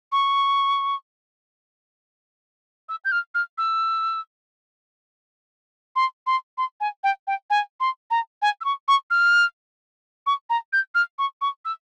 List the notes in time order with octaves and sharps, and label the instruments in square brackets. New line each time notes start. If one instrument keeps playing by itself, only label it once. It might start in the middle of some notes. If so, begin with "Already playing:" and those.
[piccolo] C#6
E6
G6
F6
F6
E6
C6
C6
C6
G#5
G5
G5
G#5
C6
A#5
G#5
E6
C#6
C#6
F6
C#6
A#5
G6
F6
C#6
C#6
E6